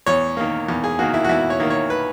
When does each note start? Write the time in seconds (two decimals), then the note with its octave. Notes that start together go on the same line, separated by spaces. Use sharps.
0.06 E2 C#5
0.37 D#3 A#3
0.69 E2
0.84 G#4
0.99 D#3 A#3 F#4
1.14 E4
1.24 F#4
1.29 E2 E4
1.50 C#5
1.59 D#3 A#3
1.70 C#5
1.90 B4